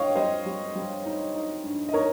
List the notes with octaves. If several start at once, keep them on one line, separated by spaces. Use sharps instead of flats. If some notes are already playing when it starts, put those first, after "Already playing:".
Already playing: G2 C#5 D#5 F5 G5
G3 C5 D#5
G3
G3
D#4
D#4
G2
D#5
D#4 A#4 C#5